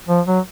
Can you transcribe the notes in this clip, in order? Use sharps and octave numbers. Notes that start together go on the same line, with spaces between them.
F3
F#3